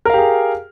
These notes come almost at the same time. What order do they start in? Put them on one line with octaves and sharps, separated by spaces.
A#4 F5 G4 G#4